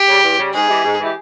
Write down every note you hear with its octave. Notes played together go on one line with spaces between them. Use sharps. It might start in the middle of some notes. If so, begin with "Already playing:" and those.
Already playing: G4
C#3 G3
E2
C#3 G3
G#2 G#4
E3 G#3 E4 G4
G#2
E3 G#3 E4 G4